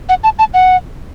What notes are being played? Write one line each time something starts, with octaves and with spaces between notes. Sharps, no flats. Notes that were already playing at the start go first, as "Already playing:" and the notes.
F#5
A5
A5
F#5